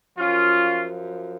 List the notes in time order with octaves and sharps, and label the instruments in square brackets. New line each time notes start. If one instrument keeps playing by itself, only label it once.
[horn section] F#2 F3 C#4 F4